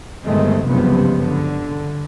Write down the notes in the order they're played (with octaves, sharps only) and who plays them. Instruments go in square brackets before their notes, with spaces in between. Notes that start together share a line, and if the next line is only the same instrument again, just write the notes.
[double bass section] G1 D#3 G#3 A3 C4
F#1 C#2 G2 C3 F3 B3
D3